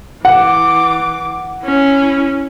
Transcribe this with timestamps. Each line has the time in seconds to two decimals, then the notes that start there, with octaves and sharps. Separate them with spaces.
0.25 E3 F#5 D6
1.64 C#4 E4